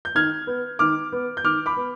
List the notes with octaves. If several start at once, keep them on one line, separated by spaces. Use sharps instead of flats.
G6
D#3 F6 G#6
B3
D#3 D6 F6
B3
G6
D#3 D6 F6
B5 D6
B3